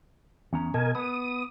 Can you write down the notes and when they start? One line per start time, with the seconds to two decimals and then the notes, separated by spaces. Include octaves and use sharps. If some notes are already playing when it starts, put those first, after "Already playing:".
0.53 E2 C#4 A#5
0.74 B2 A#4 D#5 G#5 A5
0.95 B3 B4 D#6